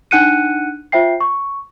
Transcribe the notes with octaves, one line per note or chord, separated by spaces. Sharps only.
D4 D#4 F#5 F#6 C#7 D#7
F4 C5 E5 G5 C7
C#6